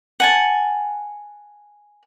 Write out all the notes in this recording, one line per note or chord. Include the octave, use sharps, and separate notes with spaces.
F#5 G#5 A5